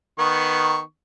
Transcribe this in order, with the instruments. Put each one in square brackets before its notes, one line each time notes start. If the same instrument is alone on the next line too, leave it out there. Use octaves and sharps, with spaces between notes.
[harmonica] D#3 B3 C#6